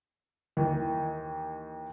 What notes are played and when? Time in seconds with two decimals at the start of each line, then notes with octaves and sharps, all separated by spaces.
0.57 D#2 E3